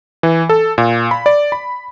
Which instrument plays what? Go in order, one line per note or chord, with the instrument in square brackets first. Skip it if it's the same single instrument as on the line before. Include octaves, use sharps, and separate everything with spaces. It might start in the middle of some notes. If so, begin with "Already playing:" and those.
[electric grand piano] E3
A4
A#2
B5
D5
B5